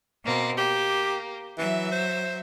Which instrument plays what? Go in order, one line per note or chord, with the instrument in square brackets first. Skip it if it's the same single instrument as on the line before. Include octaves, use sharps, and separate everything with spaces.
[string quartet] B2 A#3 C4
[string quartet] A#3 [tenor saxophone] G4
[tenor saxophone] E3 [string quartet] F#3 E5
[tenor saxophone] C5